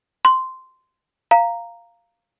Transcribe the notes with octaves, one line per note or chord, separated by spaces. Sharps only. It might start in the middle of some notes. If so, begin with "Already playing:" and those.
C6
F5 A#5